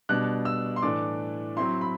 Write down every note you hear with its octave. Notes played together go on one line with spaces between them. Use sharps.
B2 G3 D4 F#6
E6
C6
A2 E3 A3 D4 D6
F#3 C4 E4 C6
B5